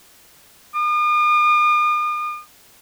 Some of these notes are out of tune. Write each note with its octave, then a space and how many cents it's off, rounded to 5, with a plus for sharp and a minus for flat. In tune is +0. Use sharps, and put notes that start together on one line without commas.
D#6 -45